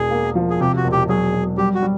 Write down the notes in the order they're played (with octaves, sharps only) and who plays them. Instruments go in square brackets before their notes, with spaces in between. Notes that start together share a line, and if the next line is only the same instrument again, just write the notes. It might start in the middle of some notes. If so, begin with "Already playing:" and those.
Already playing: [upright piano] E1 [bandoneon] G#4
[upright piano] A#3
F3
[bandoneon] G#4
[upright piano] C3 [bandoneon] G4
[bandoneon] F#4
[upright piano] E1
[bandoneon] G4
[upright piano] F#3 [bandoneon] G#4
[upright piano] F#3
[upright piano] G3 [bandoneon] G4
[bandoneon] F#4
[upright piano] G3